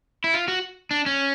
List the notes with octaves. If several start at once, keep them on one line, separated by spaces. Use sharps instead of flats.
E4
F4
F#4
D4
C#4